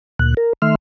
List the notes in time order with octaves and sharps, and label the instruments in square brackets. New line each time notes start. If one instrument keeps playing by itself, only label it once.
[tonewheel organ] D2 A#2 F#6
A#4
D#3 A3 E5 C6 F6